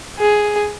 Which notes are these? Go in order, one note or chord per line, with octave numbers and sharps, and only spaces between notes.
G#4